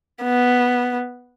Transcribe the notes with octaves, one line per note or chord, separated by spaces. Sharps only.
B3